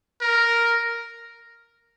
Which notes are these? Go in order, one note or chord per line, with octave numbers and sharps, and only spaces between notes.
A#4